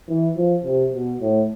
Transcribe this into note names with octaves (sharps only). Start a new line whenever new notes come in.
E3
F3
C3
B2
A2